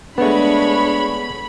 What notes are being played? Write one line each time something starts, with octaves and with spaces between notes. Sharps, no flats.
G#3 A3 B3 D4 C#5 B5